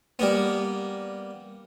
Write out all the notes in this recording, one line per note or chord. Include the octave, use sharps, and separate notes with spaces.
G3 A#3 B3